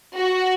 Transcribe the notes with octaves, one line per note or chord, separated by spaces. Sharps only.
F#4